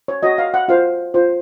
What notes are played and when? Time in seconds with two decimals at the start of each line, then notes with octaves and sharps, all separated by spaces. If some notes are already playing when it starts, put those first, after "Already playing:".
0.08 C#5
0.23 F#4 C#5 D#5
0.38 F5
0.54 F#5
0.68 F4 C5 F5
1.14 F4 C5